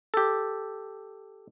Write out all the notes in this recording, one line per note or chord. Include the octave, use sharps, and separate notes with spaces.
G4 A4